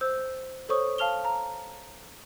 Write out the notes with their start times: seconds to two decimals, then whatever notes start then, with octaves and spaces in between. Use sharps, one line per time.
0.01 C5 E6 G6
0.69 A4 C5 C#5 C#6 D#6
0.98 F5 A5 F6 F7 G7
1.25 A#5